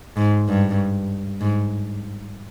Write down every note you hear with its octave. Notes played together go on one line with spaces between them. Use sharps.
G#2
G2
G#2